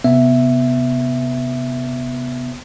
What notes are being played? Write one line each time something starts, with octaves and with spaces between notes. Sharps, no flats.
C3 B3 E5